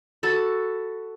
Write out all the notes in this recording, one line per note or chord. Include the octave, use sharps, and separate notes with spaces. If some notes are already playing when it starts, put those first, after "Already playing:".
F#4 A4 A5 B5